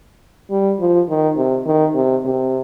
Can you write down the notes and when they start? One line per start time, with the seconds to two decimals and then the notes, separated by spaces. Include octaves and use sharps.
0.50 G3
0.80 F3
1.09 D#3
1.37 C3
1.65 D#3
1.95 C3
2.25 C3